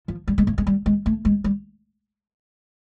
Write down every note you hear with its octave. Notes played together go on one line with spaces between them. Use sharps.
F3
G3
G#3
A3
G#3
G3
G#3
A3
G#3
G3